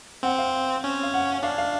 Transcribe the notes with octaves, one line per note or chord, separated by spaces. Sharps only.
C4 F#5
F5
C#4
F5
F#5
D4 F5
F5